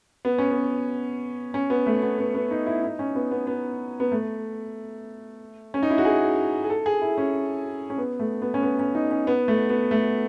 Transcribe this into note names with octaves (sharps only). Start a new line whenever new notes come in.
B3
C#4
B3
C#4
B3
A3
B3
B3
B3
D#4
E4
D#4
C#4
B3
B3
B3
B3
A3
C#4
D#4
E4
F#4
G#4
G#4
A4
G#4
E4
C#4
C#4
B3
A3
B3
C#4
B3
C#4
D#4
C#4
B3
A3
B3
A3